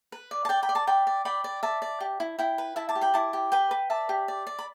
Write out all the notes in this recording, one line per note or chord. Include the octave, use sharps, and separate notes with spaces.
B4
D5
A5
D5 G5
G5 B5
D5
A5 D6
D5 G5 B5
D5
D5 G5 B5
D5
D5 E5 A5
D5
G4
E4
E4 G5
B4
E4 E5 A5
A5 D6
G4
G5 B5
E4 A5 D6
G4
B4 G5 B5
B4
D5 E5 A5
G4
D5
D5
B5